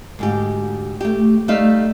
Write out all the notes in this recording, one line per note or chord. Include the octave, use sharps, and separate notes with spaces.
D2 G#2 G4
A3 G4
G3 A3 D#4 E5 F5